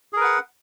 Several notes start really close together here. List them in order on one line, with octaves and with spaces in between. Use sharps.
G#4 A#4 B4 F#5